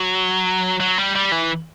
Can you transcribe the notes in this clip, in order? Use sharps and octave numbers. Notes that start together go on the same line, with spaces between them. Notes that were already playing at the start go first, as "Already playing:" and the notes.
Already playing: F#3
F#3
G3
G3
E3